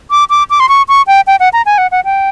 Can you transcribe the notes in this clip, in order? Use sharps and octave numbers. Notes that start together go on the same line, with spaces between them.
D6
D6
D6
C6
C#6
C#6
G5
G5
F#5
A#5
G#5
F#5
F#5
G5